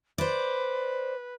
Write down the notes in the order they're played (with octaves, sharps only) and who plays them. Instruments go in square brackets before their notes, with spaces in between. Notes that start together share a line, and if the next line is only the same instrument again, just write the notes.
[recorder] B4 [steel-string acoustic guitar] C5 D5